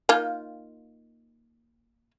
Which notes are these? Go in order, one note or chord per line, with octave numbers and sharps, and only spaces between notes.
A#3 D#4 F4